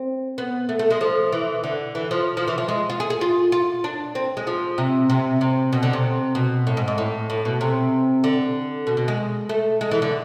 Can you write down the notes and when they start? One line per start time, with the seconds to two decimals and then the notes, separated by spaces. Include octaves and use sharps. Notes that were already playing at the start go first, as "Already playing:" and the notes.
Already playing: C4
0.38 B3
0.69 A3
0.79 A3
0.90 G#3
1.01 F3
1.33 E3
1.64 D3
1.95 E3
2.11 F3
2.37 F3
2.48 E3
2.58 F3
2.68 G#3
2.90 F4
3.00 G#4
3.10 G#4
3.21 F4
3.52 F4
3.84 D4
4.15 C4
4.37 G#3
4.47 F3
4.78 C3
5.10 C3
5.41 C3
5.73 B2
5.83 D3
5.93 C3
6.35 B2
6.67 A2
6.77 G#2
6.88 G#2
6.98 A2
7.30 A2
7.45 B2
7.61 C3
8.24 D3
8.87 B2
8.97 B2
9.08 G#3
9.49 A3
9.81 G#3
9.91 E3
10.02 D3